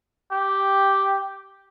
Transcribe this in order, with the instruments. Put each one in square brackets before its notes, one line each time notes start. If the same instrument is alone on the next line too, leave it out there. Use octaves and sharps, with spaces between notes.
[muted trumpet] G4